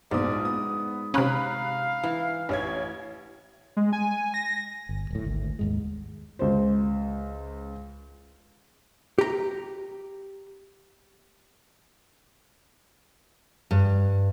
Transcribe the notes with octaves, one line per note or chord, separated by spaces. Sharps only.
A#1 G#2 B2 D5 D#6
B3 D#6
C3 C#4 F5 A#5 B5 F#6
E3
A1 C#5 G#6
G#3
G#5
A#6
G1
D1 A2
G#1 D2
D#2 G#2 G#3
C#2 C5
G4 A#5
G2